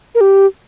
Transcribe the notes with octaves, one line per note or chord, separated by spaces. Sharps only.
A#4
G4